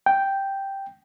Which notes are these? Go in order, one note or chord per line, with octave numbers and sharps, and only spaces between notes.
G5